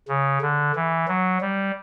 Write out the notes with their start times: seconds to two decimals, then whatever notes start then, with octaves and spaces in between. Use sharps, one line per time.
0.08 C#3
0.41 D3
0.75 E3
1.08 F#3
1.41 G3